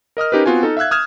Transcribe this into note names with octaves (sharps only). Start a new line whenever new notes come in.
A#4 D#5 D#6 F6
C#4 D#4 G4 A#4 B4
B3 C4 F4 F#4 G#5
D#4 A4
E5 F5 E6 F#6 G#6
D#6 F6 G#6 E7